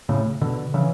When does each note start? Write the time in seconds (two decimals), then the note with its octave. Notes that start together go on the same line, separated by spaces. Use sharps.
0.09 A2 C#3
0.41 B2 D3
0.74 C#3 E3